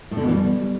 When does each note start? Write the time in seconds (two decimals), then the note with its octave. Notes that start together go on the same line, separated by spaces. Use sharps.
0.11 A2
0.17 D3
0.22 B2
0.28 E3
0.34 G3